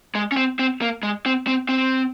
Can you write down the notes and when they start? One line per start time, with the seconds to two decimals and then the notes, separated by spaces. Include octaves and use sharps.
0.15 G#3
0.32 C#4
0.37 C4
0.59 C4
0.82 A#3
1.03 G#3
1.26 C4
1.47 C4
1.69 C4